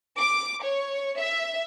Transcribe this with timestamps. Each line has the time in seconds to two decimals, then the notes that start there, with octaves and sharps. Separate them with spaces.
0.18 D6
0.63 C#5
1.19 E5